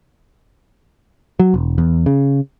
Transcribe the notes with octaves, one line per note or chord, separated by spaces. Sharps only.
F#3
E1
E2
C#3